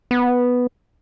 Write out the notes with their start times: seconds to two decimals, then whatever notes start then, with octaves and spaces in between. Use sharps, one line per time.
0.11 B3